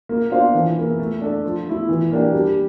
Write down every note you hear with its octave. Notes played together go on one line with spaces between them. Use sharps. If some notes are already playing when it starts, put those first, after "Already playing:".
A#3
D4 F4 C5 F5
E3
A#3 E4
A3
D4 A4
F3
A3 E4
E3
A#3 D4 G4
G3